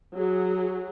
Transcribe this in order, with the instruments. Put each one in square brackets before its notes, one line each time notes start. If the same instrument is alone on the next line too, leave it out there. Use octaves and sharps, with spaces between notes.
[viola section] F#3 G#4